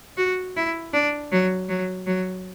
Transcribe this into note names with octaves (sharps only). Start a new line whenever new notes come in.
F#4
E4
D4
F#3
F#3
F#3